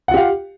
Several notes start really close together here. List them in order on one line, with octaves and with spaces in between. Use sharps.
F#5 F4 G4 F5